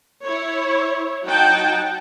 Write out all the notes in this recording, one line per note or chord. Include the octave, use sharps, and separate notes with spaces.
E4 C#5
F#3 D#4 F#5 G5 A5